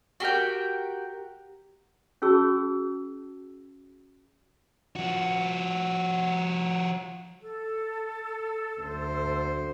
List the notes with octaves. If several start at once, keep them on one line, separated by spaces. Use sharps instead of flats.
F#4 G4 A#4 G5
C#4 F#4 G#4 A5 C#6 E6
F3 F#4
A4
D2 C5